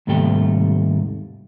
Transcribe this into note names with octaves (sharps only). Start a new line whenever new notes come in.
D#2 G#2 C3 G3 A3 G5